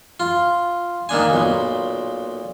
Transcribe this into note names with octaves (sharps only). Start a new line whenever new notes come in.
F4
D#3 A#3 D4 G#5
B1 A#2